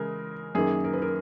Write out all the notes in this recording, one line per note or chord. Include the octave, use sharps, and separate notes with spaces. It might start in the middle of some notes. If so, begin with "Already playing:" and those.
Already playing: C#3 E3 G#3 G#4 A#4
F#2 D#3 A#3 G#4
A#4
B4
A#4